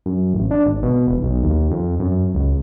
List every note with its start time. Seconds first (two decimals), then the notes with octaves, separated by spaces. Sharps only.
0.06 F#2
0.34 A1
0.51 D4
0.66 G#1
0.83 B2
1.07 E1
1.23 B1
1.43 D#2
1.71 F2
1.99 F#2
2.35 C#2